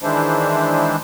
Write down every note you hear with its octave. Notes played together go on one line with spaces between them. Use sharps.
D#3 E3 G#3 D4 E4 C5